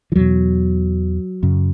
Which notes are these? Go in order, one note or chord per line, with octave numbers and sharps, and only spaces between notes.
E3
E2 B2 F#3
F#2 C#3